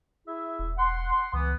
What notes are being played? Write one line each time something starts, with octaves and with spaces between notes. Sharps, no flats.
E4 G#4 E5
E1
F#5 C6
C#2 E3 B3